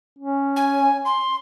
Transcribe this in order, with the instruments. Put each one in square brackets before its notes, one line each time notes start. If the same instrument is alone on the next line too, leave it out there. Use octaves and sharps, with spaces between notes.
[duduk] C#4
[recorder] G#5
C6